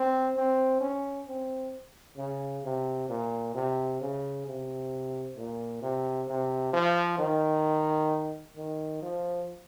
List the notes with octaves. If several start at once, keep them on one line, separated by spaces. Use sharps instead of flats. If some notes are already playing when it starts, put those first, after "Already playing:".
Already playing: C4
C4
C#4
C4
C#3
C3
A#2
C3
C#3
C3
A#2
C3
C3
F3
D#3
D#3
F3